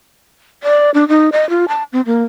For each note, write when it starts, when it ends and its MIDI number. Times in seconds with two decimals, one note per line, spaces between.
0.63 0.90 74
0.94 1.07 62
1.08 1.30 63
1.32 1.48 75
1.50 1.66 65
1.68 1.83 81
1.92 2.01 60
2.06 2.23 58